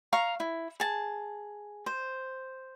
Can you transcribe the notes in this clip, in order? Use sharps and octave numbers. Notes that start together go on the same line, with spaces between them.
F5 A#5 C#6
E4
G#4 A5
C5